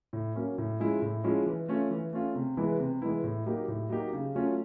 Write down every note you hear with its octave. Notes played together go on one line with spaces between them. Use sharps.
A2
F#3 A#3 C#4
A2
F3 G#3 C#4 E4
A2
F3 G#3 C#4 E4
E3
A3 C#4 F4
E3
A3 C#4 F4
C3
E3 G#3 B3 E4
C3
E3 G#3 B3 E4
A2
F#3 A#3 D#4 G4
A2
F#3 A#3 D#4 G4
C#3
F#3 A3 C#4 F4